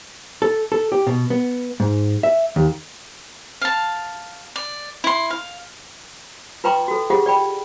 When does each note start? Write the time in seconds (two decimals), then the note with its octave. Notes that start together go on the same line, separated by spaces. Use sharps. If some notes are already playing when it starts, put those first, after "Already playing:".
0.42 A4
0.72 A4
0.92 G4
1.07 B2
1.30 B3
1.80 G#2
2.23 E5
2.56 D#2
3.61 F5 A5
4.56 D5
5.04 E4 C6
5.30 F5
6.64 F4 B4 G5 A#5 C6 D6
6.88 F#4 A4
7.10 F4 G4 G#4 D#5 F#5
7.26 D5 G5 B5